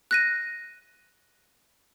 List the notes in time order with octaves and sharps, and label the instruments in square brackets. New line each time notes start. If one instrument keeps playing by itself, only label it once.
[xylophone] F#6 A#6 D#7